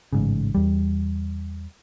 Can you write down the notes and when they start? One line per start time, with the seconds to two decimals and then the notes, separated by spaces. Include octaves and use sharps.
0.13 A1 G#2 C#3
0.55 E2 G3